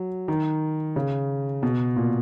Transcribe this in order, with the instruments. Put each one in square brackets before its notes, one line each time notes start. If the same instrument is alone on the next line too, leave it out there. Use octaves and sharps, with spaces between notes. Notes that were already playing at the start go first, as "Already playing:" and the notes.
Already playing: [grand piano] F#3
D#3
C#3
B2
A#2